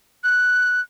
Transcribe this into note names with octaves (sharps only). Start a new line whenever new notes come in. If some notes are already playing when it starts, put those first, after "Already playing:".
F#6